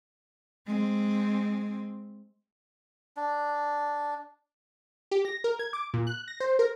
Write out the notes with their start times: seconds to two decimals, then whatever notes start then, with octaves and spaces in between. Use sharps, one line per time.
0.67 G#3 C4
3.17 D4
5.11 G4
5.25 A#6
5.44 A#4
5.59 G#6
5.73 D6
5.94 A#2
6.07 F#6
6.28 A#6
6.40 C5
6.59 A#4